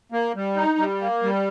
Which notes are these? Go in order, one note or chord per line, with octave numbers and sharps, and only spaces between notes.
A#3
G3
D#4
G3
A#3
G3